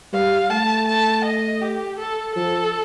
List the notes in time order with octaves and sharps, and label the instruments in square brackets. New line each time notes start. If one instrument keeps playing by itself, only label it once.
[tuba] G3 [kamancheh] F5
[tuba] A3 [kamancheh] A5
[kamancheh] A5
D#5
G4
A4
[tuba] F3 [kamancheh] A4